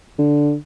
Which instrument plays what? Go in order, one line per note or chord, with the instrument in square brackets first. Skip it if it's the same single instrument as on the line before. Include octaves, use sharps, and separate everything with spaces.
[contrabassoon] D3